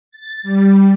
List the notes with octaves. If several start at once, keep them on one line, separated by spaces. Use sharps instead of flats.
A6
G3